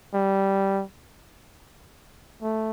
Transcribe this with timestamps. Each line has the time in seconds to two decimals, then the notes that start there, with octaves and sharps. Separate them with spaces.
0.14 G3
2.42 A3